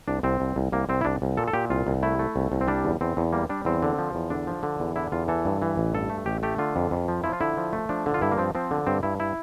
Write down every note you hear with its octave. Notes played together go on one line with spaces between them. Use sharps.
C2 D4
C2 C4
C2
C2
C2 A#3
C2 C4
E4
C2 D4
C2
A#2 A4
A4
A#2 G4
C2 F4
C2
A3 E4
A3
C2
C2
C4
G3 D4
E2
E2 C4
E2
G3 A#3
G3 D4
E2 C4
D3
F3
E2
D3 D4
F3
D3
E2
D3 E4
E2 F4
E3 A4
G2
E3
A1
G2 A4
A3
A1 G4
A3 G4
D3 F4
F2
F2
F3
F3 E4
F4
D3 E4
F3
A3
F3 D4
D3
F4
G2 E4
A#3
F3 C4
F3 C4
D3
G2 C4
G2 E4
E4